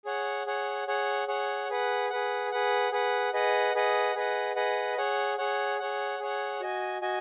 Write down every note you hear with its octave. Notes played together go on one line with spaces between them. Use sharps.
G#4 C#5 F#5
G#4 C#5 F#5
G#4 C#5 F#5
G#4 C#5 F#5
G#4 B4 F#5
G#4 B4 F#5
G#4 B4 F#5
G#4 B4 F#5
G#4 B4 D#5 F#5
G#4 B4 D#5 F#5
G#4 B4 D#5 F#5
G#4 B4 D#5 F#5
G#4 C#5 F#5
G#4 C#5 F#5
G#4 C#5 F#5
G#4 C#5 F#5
F#4 D#5 G#5
F#4 D#5 G#5